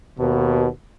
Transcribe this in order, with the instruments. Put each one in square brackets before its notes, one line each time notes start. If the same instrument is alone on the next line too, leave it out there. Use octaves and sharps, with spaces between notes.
[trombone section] D#2 B2